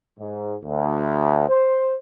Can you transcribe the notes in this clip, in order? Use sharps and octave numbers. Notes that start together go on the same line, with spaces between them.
G#2
D2
C5